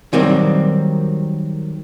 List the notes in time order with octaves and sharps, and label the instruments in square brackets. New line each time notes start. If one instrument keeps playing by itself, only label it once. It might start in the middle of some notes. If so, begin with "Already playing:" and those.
[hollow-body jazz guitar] D#3 F#3 G3 A#3 C4